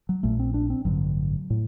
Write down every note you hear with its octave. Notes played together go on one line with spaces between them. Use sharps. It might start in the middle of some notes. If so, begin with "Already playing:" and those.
F#3
A#1 A#2 A3
C4
D4
C4
A1 G2 D3 F#3
A2